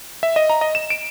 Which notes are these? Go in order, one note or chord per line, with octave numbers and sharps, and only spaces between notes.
E5
D#5
A#5
D#5
E7
D7